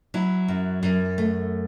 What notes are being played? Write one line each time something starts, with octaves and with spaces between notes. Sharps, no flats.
F#3 E4
F#2
F#2
A3